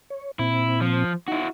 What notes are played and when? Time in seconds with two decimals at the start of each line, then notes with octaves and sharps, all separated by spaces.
0.10 C#5
0.39 A#2 C4 E4
0.81 F3
1.28 D#4 E4 F#4